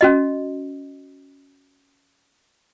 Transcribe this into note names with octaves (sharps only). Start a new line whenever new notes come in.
C#4 F#4 D#5